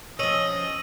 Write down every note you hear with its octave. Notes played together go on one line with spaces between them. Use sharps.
F3 C#4 D#5 E6 D#7 F#7